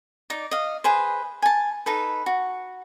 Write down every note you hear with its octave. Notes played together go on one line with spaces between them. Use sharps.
D#4 D5
D#5 F5
G#4 B4 C5
G#5 A5
D#4 A4 B4
F#4